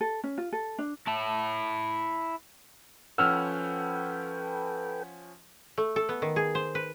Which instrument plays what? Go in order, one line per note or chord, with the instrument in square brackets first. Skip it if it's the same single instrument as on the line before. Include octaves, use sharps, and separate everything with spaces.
[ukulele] A4
C#4
F4
A4
D4
[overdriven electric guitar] E4 A5
[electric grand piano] F3 C#4 F#5 [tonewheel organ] A4 B4 G5 [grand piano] E6 F6
[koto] A3
A4
B3
D#3
G#4
C5
B4